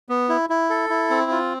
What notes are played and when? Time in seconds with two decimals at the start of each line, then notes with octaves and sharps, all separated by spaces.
0.09 B3
0.29 E4
0.50 E4
0.70 A4
0.90 E4
1.10 C4
1.31 F4